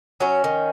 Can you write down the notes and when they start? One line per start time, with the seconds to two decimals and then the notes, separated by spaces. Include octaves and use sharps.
0.20 F#3 C#4
0.44 D#3